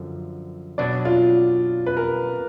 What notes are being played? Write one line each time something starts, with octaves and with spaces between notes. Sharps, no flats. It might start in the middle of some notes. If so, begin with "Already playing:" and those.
Already playing: F#2 D3 F3
B2 F#3 D4 D5
F4
B4
A#4